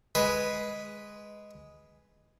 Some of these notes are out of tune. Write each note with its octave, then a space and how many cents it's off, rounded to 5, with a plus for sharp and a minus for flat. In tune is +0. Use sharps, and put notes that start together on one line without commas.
G#3 +0 B4 +0